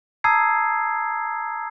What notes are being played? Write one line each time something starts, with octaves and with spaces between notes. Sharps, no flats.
A5 A#5 D#6 E6 G#6 C7